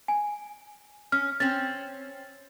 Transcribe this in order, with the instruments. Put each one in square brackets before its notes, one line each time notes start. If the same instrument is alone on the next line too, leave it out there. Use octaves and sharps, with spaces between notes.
[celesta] G#5
[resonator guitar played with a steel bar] C#4 [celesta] F6
[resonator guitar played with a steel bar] C4 C#4 [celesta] A6